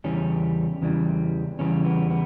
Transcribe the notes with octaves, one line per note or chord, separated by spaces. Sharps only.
E2 C#3 E3 G3 C#4
E2 C#3 E3 G3
E2 C#3 E3 G3 C#4
B3
B3